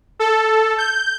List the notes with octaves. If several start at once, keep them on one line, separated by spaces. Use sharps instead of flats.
A4
G6